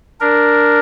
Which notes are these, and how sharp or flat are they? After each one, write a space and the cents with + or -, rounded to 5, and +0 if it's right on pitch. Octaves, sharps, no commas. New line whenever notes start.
D4 +0 A#4 +0